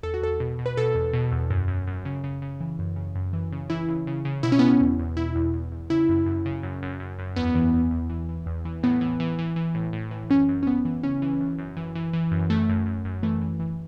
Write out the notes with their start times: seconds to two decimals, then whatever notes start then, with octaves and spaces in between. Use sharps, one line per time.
0.03 E2 A4
0.14 F#4
0.22 E2 A4
0.40 B2
0.59 B2
0.66 B4
0.77 B2 A4
0.95 E2
1.13 B2
1.32 E2
1.50 F#2
1.68 F#2
1.87 F#2
2.05 C#3
2.24 C#3
2.42 C#3
2.61 E3
2.79 F#2
2.96 C#3
3.15 F#2
3.33 E3
3.52 C#3
3.70 E3 E4
3.88 C#3
4.07 C#3
4.25 C#3
4.43 B2 E4
4.52 C#4
4.59 B2 B3
4.68 C#4
4.81 E2
4.99 E2
5.17 B2 E4
5.35 E2
5.54 E2
5.72 E2
5.90 C#3 E4
6.09 F#2
6.26 F#2
6.46 C#3
6.63 F#2
6.82 F#2
7.00 F#2
7.19 F#2
7.36 E2 B3
7.55 E3
7.73 E2
7.91 E2
8.10 E3
8.29 E3
8.46 E2
8.65 E3
8.83 A2 B3
9.01 E3
9.20 E3
9.39 E3
9.56 E3
9.75 A2
9.93 A2
10.11 E3
10.30 F#2 C#4
10.49 F#2
10.63 C#4
10.66 F#2 B3
10.85 E3
11.03 C#3 C#4
11.22 E3
11.40 F#2
11.59 F#2
11.77 E3
11.95 E3
12.13 E3
12.31 F#2
12.50 F#2 A3
12.69 F#2
12.86 F#2
13.05 F#2
13.23 E3 A3
13.41 E3
13.59 E3